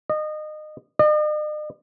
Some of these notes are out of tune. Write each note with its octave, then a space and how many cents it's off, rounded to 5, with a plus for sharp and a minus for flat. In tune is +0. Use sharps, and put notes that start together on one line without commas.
D#5 -25
D#5 -45